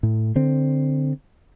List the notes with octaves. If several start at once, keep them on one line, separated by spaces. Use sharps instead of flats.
A2
D3 C4